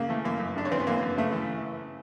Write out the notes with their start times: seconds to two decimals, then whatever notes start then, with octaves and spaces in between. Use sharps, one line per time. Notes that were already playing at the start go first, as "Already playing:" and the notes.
Already playing: C#3 A#3
0.09 E3 A3
0.24 F#2 A#3
0.40 F#2
0.56 C#3 D4
0.65 C#4
0.71 E3 C4
0.80 B3
0.87 F#2 A#3
1.02 F#2
1.18 C#3 A3
1.33 E3